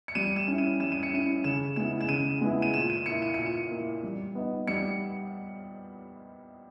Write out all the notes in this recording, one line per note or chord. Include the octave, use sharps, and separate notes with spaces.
C#7
G3 D#7
E7
C#4 E4
D#7
G3 E7
D#7
C#7
C#4 E4 D#7
C#3 E7
G#3 B3 E4 E7
E7
C#3 D#7
G#3 B3 E4
D#7
A#2 E7
D#7
A#3 E4 C#7
D#7
A#2 C#7
D#7
A#3 E4
G3
B3 D#4
G3 C#7